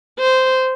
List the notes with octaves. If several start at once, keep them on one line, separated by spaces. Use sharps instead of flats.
C5